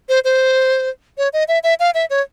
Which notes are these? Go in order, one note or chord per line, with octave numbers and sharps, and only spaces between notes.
C5
C5
C#5
D#5
E5
E5
F5
E5
C#5